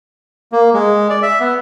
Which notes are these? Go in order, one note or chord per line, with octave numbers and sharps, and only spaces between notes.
A#3
G#3
D5
E5
B3